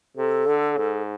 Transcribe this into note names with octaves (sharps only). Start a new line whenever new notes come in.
C3 A4
D3
G#2